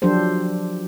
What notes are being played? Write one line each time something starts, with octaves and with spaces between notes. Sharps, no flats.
F3 F#3 D4 G4 A4 C5